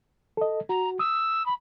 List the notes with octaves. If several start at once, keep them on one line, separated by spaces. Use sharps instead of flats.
A4 D#5
F#4 A#5
D#6 E6
B5